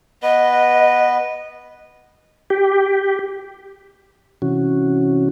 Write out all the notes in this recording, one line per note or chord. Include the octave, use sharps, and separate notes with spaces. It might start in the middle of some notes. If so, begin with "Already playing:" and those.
B3 B4 D#5
G4
C3 E3 C#4 F#4